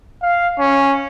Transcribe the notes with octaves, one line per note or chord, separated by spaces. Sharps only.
F5
C#4